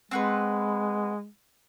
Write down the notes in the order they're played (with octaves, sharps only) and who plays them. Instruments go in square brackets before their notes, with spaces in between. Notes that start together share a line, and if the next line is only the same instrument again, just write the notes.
[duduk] G#3 [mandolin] C4 F#4 B4